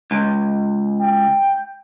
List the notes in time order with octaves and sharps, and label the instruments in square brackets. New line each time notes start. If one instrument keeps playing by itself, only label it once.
[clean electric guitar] C#2
[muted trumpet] G5